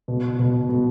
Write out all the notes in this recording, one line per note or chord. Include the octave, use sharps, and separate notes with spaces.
B2
B2
B2